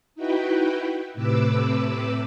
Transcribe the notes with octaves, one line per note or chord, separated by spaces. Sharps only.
D#4 E4 F#4 B4 G5
A2 C3 B4 D6 E6